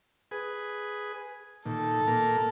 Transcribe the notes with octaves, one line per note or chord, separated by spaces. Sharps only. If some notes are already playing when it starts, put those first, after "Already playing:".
G#4 B4
A#2 D#3 A4
A#2 A#3 A#4